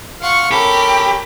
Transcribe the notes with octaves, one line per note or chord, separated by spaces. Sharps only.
F4 F5 F#5 C#6
C#4 G4 A4 A#4 B5